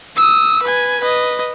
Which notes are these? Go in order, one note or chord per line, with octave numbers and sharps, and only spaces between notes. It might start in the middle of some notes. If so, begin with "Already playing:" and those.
D#6 E6
B4 G#5
B4 D#5